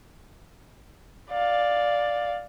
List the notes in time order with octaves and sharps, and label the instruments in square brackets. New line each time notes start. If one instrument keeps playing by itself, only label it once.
[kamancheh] D5 F5